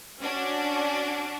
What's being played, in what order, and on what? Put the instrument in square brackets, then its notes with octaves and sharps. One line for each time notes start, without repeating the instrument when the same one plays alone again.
[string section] C#4 D4 F#4